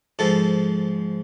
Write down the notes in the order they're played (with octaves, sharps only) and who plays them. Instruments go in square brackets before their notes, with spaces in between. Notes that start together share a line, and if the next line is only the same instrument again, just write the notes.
[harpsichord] G#2 F3 A4